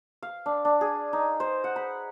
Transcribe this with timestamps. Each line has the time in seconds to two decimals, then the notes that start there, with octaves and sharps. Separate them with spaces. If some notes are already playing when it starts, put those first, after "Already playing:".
0.23 F5
0.46 D4
0.65 D4
0.81 G#4
1.13 D#4
1.40 C5
1.64 F#5
1.76 B5